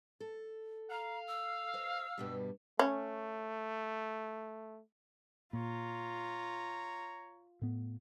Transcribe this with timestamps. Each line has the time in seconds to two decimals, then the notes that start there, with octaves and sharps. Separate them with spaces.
0.20 A4
0.91 F5 A#5
1.27 E6
1.74 C5 D#5
2.18 G2 B2 G3
2.79 A3 C#4
5.53 A#2 F4 C#5 A#5
7.62 A2 B3